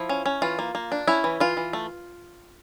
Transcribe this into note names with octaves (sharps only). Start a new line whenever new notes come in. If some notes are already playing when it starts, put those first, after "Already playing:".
Already playing: F3 E4
C#4
C#4
E3 F4
A#3
A#3
D4
C#4 E4
E3
E3 F4
E3
A3